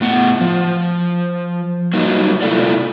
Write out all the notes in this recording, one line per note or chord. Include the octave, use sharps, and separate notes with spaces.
A2 B3 F#5
F3
F#3 G3 A#3 D#4
C3 G#3 E4 F4 A4 D5